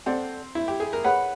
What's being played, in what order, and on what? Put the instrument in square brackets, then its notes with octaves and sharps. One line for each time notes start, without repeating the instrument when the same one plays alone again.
[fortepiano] C4 [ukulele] A4 D5 F#5
[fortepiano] E4
G4
G#4
A#4
[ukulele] G#4 C#5 F#5 B5 [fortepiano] B4